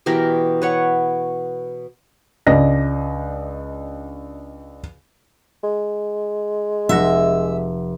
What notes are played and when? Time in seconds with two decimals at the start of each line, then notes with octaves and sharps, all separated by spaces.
0.06 B2 E3 G4 A#4
0.62 B4 C#5 F#5
2.46 C#2 D4 D5 D#5 A#6
5.64 G#3
6.89 F1 E5 F#5 A#6